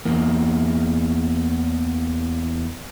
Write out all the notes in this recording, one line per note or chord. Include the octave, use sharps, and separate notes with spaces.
E2 A#3